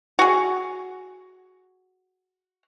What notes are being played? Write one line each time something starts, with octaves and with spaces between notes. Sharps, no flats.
F#4 G#4